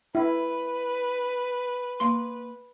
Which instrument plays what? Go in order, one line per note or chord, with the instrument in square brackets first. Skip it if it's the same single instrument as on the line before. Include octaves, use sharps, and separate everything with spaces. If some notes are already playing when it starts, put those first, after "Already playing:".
[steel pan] E4 [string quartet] B4
[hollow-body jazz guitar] A#3 C6